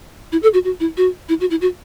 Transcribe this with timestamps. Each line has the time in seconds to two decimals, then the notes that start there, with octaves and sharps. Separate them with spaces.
0.32 E4
0.43 A4
0.54 F#4
0.64 F#4
0.80 E4
0.97 F#4
1.29 E4
1.40 F#4
1.51 E4
1.61 F#4